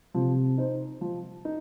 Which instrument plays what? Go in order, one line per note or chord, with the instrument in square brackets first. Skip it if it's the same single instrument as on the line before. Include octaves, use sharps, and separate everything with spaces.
[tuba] C3 [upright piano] F3
[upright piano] D#4 C5
F3
D#4